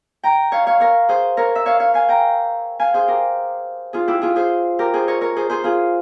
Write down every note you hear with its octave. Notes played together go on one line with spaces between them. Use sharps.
G5 A#5
C#5 F5
C#5 F5
A#4 C#5
G#4 C5
A#4 C#5
E5
C#5 F5
C#5 F5
F5 G#5
G5 A#5
F5 G#5
G#4 C5
G4 A#4
F4 G#4
E4 G4
F4 G#4
G#4 C5
G4 A#4
G#4 C5
A#4 C#5
A#4 C#5
G#4 C5
G#4 C5
F4 G#4